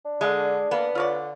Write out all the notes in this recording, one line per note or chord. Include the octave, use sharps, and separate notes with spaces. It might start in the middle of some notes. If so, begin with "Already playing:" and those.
D4
D3 G#3
A#3 B3
D3 F4 C#5 D5